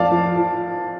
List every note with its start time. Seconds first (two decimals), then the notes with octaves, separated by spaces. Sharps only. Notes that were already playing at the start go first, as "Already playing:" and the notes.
Already playing: F2 F3 D5 F5 A5
0.11 F3
0.36 F3